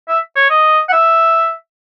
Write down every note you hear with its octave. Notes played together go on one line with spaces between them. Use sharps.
E5
C#5
D#5
F#5
E5